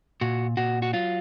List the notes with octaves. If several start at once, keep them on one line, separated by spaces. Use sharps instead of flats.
A#2 F#4
A#2 F#4
F#4
F#3 F4